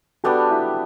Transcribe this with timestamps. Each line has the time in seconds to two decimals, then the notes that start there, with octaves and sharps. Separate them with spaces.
0.24 G3 B3 D4 F#4 A4
0.51 E4 G4